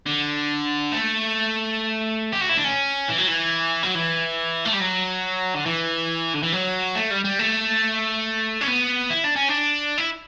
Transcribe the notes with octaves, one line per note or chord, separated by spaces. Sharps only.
D3
A3
G4
F#4
E4
D4
C#4
E3
F#3
E3
F#3
E3
A3
G3
F#3
D3
E3
D3
E3
F#3
A3
G3
G3
A3
C#4
B3
E4
D4
C#4
D4
E4